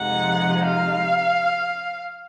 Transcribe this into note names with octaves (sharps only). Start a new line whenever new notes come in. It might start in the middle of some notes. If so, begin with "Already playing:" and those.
Already playing: F2 C3 F3 G#3 D#4 F#5
F5